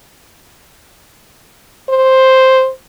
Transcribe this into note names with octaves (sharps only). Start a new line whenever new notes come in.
C5